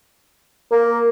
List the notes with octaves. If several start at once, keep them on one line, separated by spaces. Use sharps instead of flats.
A#3